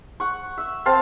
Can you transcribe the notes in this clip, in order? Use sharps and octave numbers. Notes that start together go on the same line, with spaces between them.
F#5 C#6
E5
C4 C5 F5 A5